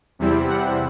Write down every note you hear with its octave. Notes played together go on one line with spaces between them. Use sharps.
E2 C3 G3 C4 E4
F#5